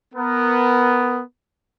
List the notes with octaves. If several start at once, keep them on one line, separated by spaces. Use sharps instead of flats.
B3 A#4